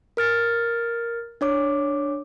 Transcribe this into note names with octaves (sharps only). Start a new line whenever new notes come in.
A#4 F6 A6 C#7
D4 C#5 D6